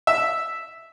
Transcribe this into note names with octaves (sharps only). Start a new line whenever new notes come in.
E5